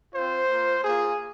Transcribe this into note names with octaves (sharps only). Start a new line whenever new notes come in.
C4 F4 C5
A#3 F4
A#3 F4 G#4